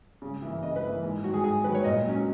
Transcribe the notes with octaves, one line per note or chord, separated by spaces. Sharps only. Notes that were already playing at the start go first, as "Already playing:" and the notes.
C#3
E3 A#3 E4
C#3 D#5
B4
E3 A#3 E4
G#2
D#3 F#3 F#4
G#4
G#2 G#4
D#3 F#3 B4
C#5
A#2 D#5
F#3 C#4